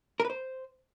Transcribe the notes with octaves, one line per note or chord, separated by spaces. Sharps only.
A#4
B4
C5